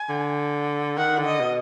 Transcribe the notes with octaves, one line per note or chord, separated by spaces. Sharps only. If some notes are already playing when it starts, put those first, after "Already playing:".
Already playing: G#5
D3
D#3 F#5
D3
D#5
B2